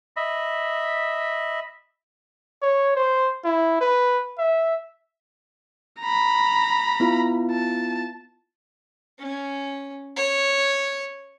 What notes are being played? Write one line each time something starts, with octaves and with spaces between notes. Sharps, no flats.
D#5 E5 B5
C#5
C5
E4
B4
E5
A#5 B5
B3 E4 F4
A5
C#4
C#5